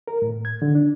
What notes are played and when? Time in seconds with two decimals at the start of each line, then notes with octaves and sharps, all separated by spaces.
0.08 A#4
0.22 A2
0.45 G#6
0.62 D3
0.75 D4